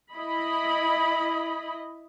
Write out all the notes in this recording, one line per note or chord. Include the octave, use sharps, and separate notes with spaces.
E4 D#5 B5